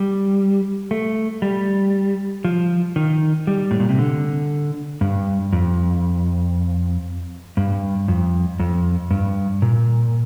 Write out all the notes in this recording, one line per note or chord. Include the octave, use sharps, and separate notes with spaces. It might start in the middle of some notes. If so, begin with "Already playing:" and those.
Already playing: G3
A3
G3
F3
D#3
G3
A2
A#2
C3
D3
G2
F2
G2
F2
F2
G2
A#2